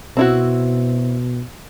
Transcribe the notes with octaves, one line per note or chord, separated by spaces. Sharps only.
B2 C4 E4 F#4